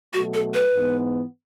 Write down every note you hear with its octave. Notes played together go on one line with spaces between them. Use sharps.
B2 F#3 A3 F#4
A4
B4
G#2 E3 B3